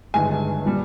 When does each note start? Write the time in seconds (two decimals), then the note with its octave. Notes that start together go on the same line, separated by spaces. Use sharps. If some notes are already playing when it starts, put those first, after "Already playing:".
0.14 G1 G2 D#3 G#3 G#5
0.65 A#2 G3